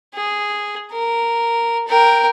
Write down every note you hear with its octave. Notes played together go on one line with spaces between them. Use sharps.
G#4
A#4
A#4 G5